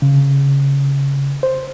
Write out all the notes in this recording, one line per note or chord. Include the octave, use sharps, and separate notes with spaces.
C#3
C5